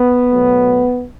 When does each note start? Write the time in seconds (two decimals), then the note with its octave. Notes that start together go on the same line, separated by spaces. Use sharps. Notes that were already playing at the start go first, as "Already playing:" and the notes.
Already playing: B3
0.29 B2 F#3 A3